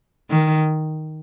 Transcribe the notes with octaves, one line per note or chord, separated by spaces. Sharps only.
D#3